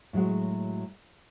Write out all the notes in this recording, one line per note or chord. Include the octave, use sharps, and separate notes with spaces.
A2 F#3 G#3 F#4